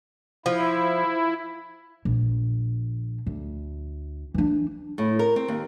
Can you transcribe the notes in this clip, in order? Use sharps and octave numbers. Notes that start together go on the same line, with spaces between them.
F3 E4
A#1
D2
E3 D4
A2
A#4
C4
D#2